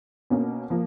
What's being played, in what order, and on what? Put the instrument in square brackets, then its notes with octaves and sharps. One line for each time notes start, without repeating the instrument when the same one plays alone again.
[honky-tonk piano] B2 A#3 C#4
F3 A#3